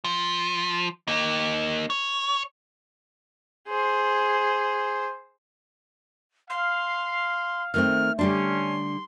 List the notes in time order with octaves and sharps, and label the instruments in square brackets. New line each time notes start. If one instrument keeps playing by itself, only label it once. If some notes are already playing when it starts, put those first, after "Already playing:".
[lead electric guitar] F3
A#3 D#4
C#5
[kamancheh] G#4 C5
[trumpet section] F5 [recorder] C6
[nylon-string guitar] D#3 A3 C4 [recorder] F6
[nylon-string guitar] D3 G3 D4 [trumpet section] C#4 [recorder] C6